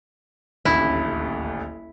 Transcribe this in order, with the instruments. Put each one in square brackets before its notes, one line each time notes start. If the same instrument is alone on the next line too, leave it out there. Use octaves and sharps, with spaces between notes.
[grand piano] D#1 A1 D2 [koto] E4